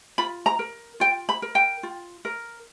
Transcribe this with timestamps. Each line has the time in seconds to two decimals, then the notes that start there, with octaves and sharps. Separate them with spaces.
0.18 F4 B5
0.46 A#5
0.59 A#4
1.00 F4 G5
1.29 B5
1.42 A#4
1.55 G5
1.83 F4
2.25 A#4